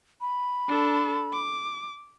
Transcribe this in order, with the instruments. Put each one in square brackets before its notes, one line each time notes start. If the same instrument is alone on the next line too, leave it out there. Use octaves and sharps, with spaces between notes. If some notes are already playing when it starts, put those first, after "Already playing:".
[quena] B5
[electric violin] D4 A4
D6